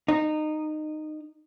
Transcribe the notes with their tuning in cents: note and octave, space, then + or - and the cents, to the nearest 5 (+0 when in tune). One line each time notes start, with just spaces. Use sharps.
D#4 -20